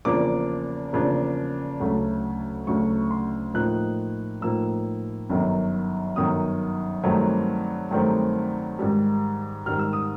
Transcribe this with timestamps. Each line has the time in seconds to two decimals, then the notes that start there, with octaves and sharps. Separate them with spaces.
0.05 E2 C#3 F3 A#3 D4 D6
0.93 E2 C#3 F3 A#3 D4
1.80 D2 C#3 F#3 A3
2.67 D2 C#3 F#3 A3 C#6
3.11 C6
3.54 A2 F3 A#3 D#4 F#6
4.41 A2 F3 A#3 D#4 E6
5.29 G1 F#2 D#3 F#3
6.16 G1 F#2 D#3 F#3 D#6
7.03 G2 D#3 F#3 A3 C4
7.91 G2 D#3 F#3 A3 C4
8.79 G#2 D#3 G3
9.66 G#2 D#3 G3 F6
9.79 E6
9.93 D#6